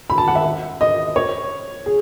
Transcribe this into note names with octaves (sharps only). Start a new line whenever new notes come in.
B5
A5
F#5
E5
D#5
C#5
G#4